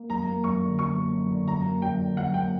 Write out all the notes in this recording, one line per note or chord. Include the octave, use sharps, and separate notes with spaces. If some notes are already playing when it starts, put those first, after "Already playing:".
Already playing: A#3
F#2 A#5
A#3
F#2 C#6
D3
F#2 C#6
A#3
F#2
D3
F#2 A#5
A#3
F#2 G5
D3
F#2 F#5
A#3 G5